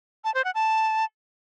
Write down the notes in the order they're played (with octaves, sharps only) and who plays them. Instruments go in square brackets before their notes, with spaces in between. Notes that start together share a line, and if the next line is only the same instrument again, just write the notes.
[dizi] A5
C5
F#5
A5